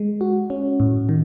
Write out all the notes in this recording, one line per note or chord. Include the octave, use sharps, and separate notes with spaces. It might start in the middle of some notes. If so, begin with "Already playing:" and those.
Already playing: G#3
F#4
C#4
A2
D#3